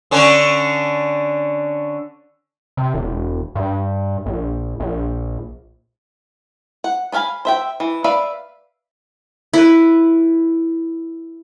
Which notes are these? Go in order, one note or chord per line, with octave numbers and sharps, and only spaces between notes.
D3 C#4 D4
C3
E1
G2
A#1
A#1
F#5
B3 D4 F5 G#5 B5
C5 E5 G5
E3
B4 D5 E5 F5
E4 B4